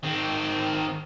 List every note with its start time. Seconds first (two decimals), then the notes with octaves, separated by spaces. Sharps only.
0.03 D#3 C4